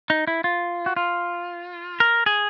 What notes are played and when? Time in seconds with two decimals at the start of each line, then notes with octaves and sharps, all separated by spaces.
0.10 D#4
0.27 E4
0.44 F4
0.86 F#4
0.96 F4
2.00 A#4
2.26 G#4